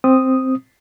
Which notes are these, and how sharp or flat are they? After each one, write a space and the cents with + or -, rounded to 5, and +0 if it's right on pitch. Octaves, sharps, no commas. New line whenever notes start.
C4 +0 D#6 +0